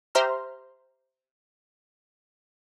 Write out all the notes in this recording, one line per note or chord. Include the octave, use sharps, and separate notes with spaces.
G4 C5 E5 A#5 C6 F6